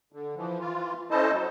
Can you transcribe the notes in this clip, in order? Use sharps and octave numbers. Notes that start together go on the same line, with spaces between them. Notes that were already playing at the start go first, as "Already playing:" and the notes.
D3
E3 F3
E3 F4
C#4 E4 A4 C5 D#5 A5
F#3